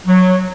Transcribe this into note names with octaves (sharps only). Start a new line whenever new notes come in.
F#3